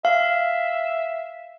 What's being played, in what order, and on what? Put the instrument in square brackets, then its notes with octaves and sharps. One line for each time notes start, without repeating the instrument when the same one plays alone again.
[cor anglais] E5 [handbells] F5